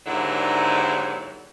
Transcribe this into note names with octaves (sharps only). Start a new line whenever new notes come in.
D#2 G#2 D3 F#3 E4 D5